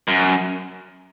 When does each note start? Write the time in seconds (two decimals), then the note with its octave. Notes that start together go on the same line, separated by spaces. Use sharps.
0.08 F#2